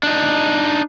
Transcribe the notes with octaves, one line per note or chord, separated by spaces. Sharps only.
D4 D#4